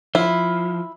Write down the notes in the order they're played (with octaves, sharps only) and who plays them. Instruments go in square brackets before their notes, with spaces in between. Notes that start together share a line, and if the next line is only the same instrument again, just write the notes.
[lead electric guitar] F3 [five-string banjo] E4